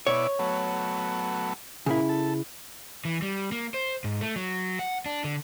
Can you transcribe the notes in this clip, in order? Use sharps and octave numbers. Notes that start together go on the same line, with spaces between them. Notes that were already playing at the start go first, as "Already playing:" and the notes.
B2 E4 C#5 D5
F#3 A3 B3
A#2 C#3 E4
A4
E3
G3
A#3
C5
G#2
A3
F#3
F#5
D4
D3